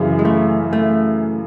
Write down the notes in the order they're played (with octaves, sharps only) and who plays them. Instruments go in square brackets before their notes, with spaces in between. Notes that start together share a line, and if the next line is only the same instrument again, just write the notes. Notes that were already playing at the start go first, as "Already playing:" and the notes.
Already playing: [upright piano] F#2 C#3 E3
[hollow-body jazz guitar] G#3
A3
A3